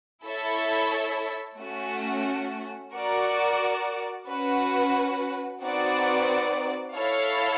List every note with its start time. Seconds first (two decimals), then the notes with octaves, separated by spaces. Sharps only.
0.24 E4 A4 C#5 E5
1.58 A3 C#4 F#4
2.93 F#4 A#4 D5
4.28 C#4 F#4 B4
5.61 C4 D#4 F#4 B4 D5
6.96 E4 A4 C#5 F5